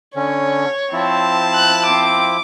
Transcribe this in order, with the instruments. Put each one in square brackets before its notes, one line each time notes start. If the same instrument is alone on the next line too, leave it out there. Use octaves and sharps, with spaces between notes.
[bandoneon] D3 C#4 [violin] C#5
[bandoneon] F3 E4 [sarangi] C4 [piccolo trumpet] A5
[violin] F#6
[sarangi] C4 [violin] D6